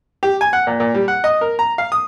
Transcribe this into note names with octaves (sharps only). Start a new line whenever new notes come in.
G4
G#5
F#5
A#2
A#2
G3
F#5
D#5
A#4
A#5
F5
D#6